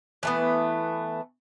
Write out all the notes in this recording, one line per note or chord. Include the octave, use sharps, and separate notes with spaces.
E3 A3 B3